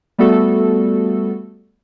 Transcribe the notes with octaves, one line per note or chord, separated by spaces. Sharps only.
G3 A3 B3 F#4 A4